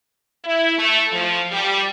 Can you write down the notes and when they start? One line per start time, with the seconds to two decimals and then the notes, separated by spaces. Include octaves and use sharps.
0.45 E4
0.78 A3
1.12 F3
1.51 G3